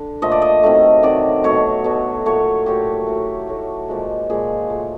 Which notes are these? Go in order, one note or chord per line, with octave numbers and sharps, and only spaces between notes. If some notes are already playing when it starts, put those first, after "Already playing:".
Already playing: D3
A#2 F3 A3 D#5
D5
D#5
C3 D#3 F#3 A3
C3 D#3 F#3 A3 D5
B2 F#3 A3 C#5
B2 F#3 A3
A#2 F#3 A3 C#5
A#2 F#3 A3 G4
A2 F#3 A3
A2 F#3 A3
A#2 F3 G#3
A#2 F3 G#3 G#4
A#2 F#3 A3